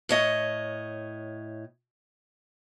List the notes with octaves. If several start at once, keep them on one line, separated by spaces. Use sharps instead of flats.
A2 C#5 D#5